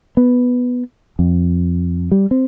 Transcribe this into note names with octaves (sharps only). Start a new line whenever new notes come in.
B3
F2
G3
C4